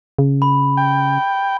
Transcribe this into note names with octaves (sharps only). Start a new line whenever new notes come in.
C#3
B5
G5